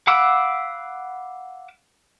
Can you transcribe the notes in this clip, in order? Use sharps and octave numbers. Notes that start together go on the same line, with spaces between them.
F5 F#5 B5 D6 E6